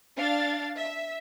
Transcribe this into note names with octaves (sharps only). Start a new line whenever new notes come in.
D4 F5 A6
E5